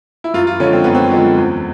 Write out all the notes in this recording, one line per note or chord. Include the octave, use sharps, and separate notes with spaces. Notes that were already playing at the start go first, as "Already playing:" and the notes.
E4
F#2 F4
F4
D3 F3 G#3 C#4
C4
F#2 B3
C4
D3 F3 G#3
E2